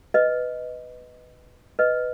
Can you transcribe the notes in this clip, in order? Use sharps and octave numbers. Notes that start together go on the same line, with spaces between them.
B4 D#5
B4 D#5